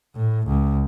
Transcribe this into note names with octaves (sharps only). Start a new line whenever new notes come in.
A2
C#2